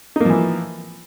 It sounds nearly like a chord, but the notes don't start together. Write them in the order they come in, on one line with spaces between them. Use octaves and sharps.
D#4 A#3 F3 E3